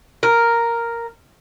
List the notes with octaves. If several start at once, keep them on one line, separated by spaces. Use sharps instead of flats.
A#4